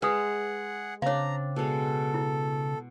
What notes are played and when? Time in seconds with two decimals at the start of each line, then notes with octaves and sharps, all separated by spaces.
0.02 G#3 G#4 B4 F#5 G#5 D#6
1.02 C#3 C4 D4 C#5 F5 A#5
1.56 B2 G#3 A4
2.14 E4